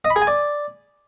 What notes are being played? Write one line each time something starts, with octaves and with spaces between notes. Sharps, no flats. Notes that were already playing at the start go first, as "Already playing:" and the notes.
D#5
B5
G#4
G#5
D5